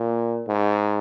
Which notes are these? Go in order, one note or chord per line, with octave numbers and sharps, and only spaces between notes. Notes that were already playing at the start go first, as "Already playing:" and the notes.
Already playing: A#2
G#2